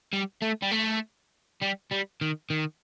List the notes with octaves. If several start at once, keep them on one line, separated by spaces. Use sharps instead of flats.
G3
A3
G3
A3
G3
G3
D#3
D#3